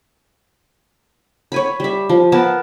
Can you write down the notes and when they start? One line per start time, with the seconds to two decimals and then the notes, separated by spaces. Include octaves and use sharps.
1.52 C#5 G#5 B5
1.80 G3 E5
2.09 F3
2.32 B3 A#4 A5